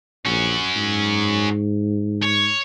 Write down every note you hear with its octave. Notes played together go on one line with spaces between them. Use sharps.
A#1 C#4 F#4
G#2
C#5